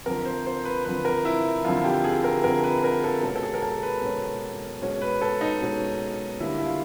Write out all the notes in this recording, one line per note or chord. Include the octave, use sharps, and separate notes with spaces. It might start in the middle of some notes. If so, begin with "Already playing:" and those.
F2 D3 F3 A#4
C5
C5
B4
F2 D3 F3 B4
A#4
E4
F2 D3 F3 F4
G4
G#4
A#4
F2 D3 F3 A#4
B4
A#4
A4
B2 G#3 C#4 A4
A4
G#4
A#4
A4
B4
B2 G#3 C#4
B2 G#3 C#4
B4
A4
D#4
B2 G#3 C#4
D3 G3 A#3 D4 E4
E4
F4